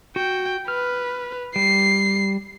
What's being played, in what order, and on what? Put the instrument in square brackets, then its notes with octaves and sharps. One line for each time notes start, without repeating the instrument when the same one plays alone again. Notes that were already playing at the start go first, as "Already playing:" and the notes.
[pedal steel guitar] F#4 [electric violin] G5
[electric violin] B4 [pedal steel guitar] F6
[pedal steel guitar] G3 [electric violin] C7